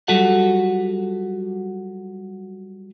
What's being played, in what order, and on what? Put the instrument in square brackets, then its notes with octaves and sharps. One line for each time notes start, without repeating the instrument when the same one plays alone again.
[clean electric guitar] F#3 G3 F4 F#4 A4 F#5